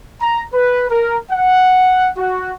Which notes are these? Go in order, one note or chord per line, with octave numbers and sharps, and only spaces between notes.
A#5
B4
A#4
F#5
F#4